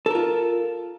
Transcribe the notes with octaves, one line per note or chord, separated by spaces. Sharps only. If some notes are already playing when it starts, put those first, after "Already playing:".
F4 A4 A#4